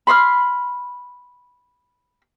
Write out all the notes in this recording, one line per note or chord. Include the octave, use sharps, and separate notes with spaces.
B5 C6 D#6 F6